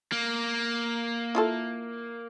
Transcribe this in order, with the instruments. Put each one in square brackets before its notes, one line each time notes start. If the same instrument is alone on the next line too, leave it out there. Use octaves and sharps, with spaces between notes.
[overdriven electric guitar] A#3
[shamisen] E4 F4 A4